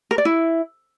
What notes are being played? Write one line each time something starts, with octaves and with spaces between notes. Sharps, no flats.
A#4
D5
E4